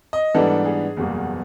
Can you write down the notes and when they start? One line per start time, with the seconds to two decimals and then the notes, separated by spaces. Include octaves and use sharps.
0.13 D#5
0.34 G#2 E3 G3 B3 D4 A4
0.66 G#4
0.97 F#1 E2 B2 G3 A#3